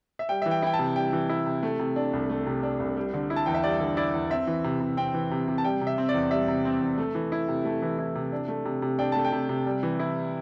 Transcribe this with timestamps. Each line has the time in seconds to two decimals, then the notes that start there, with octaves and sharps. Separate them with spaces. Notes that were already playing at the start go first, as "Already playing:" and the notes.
0.19 E5
0.29 G3 G5
0.42 E3 E5
0.51 G5
0.62 E4 G5
0.74 A5
0.79 C3
0.96 G3 G5
1.13 E3
1.29 E4
1.46 C3
1.63 A3
1.79 C3
1.96 D4
2.13 C2
2.30 A3
2.47 C3
2.63 D4
2.80 C2
2.97 G3
3.14 D3
3.30 E4
3.36 A5
3.46 E2 G5
3.54 E5
3.64 G3 D5
3.80 D3
3.97 E4 D5
4.14 E2
4.31 C4 E5
4.47 E3
4.64 C3
4.80 C3
4.97 C4 G5
5.14 E3
5.31 C3
5.48 C3
5.58 A5
5.64 G3 G5
5.81 C3
5.87 E5
5.98 C4
6.09 D5
6.14 E2
6.31 G3 E5
6.48 C3
6.65 C4
6.81 E2
6.98 A3
7.15 E3
7.32 E4
7.48 C3
7.65 A3
7.82 E3
7.98 E4
8.15 C3
8.32 D4
8.48 A3
8.65 C3
8.82 C3
8.99 D4 G5
9.12 A3 A5
9.25 G5
9.32 C3
9.49 C3
9.66 G3
9.83 E3
9.99 E4